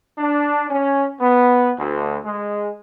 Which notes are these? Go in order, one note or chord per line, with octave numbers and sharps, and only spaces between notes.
D4
C#4
B3
D2
G#3